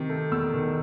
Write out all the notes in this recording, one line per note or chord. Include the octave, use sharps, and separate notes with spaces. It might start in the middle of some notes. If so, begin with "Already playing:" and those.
Already playing: C3 D#3
A3
E2 E6
D#3